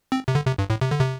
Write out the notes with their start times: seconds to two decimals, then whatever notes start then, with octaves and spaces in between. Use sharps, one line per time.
0.12 C4
0.28 C3
0.35 D3
0.47 C3
0.58 G2
0.70 A2
0.81 C3
0.91 D3
1.01 C3